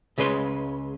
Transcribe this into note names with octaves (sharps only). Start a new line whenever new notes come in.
C#2 C#3 G#3 B4 C6